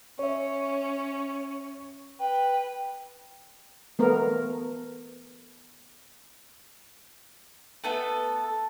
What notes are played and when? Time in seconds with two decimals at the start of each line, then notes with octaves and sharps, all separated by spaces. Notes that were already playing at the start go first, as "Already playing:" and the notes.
0.19 C#4 C#5 E5
2.20 B4 G5
3.99 A3 B3 A#4
7.84 A3 B3 A4